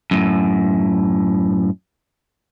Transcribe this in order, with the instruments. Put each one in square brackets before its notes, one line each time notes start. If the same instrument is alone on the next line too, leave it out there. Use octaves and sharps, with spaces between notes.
[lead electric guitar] F#2 A2